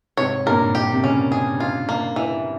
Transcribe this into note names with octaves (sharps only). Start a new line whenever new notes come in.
G#2 C3 C#5
G2 A#2 A#4
G4
C3
A#2 C#3 C#4
G#4
F4
A#3
E3